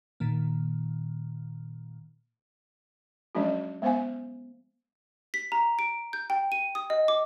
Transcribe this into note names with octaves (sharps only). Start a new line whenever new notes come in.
A#2 D#3 A#3
F3 F#3 G#3 C#4 D4 F#4
G#3 B3 C5 F5 G#5
B6
A#5
D7
G6
G5
D#7
D#6
D#5
D6